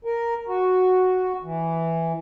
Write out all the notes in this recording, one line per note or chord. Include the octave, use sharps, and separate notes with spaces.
A#4
F#4
E3